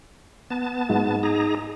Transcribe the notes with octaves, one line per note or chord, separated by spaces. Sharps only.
B3 A5
G#2
D#4 G#4 A#5